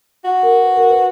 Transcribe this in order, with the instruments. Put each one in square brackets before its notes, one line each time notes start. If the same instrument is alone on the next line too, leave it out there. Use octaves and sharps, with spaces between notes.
[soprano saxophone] F#4
[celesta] A#4
B4
A#4
B4